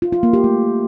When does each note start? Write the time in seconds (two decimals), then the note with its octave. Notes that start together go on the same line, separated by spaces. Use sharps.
0.02 F4
0.13 F4
0.23 A#3
0.33 G4
0.44 A3